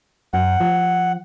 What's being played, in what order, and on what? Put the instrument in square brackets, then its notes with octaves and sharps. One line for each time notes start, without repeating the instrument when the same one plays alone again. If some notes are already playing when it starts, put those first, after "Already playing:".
[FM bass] F#2 [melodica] F#5
[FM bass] F3